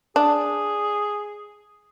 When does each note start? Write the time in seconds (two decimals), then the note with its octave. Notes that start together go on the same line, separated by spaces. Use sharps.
0.16 D4 G#4